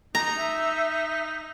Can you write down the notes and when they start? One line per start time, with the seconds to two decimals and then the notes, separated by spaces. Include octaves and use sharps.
0.15 D#4 A#5
0.37 E5